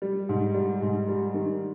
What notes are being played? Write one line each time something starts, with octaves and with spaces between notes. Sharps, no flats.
G3
G#2
G3
G#2
G3
D#3